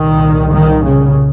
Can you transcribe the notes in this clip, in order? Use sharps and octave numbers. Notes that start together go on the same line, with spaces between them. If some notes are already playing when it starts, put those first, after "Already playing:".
Already playing: C2 A#2 D#3
D#3
C#3